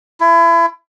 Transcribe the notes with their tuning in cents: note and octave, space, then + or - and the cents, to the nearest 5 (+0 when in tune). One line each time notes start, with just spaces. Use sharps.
E4 +30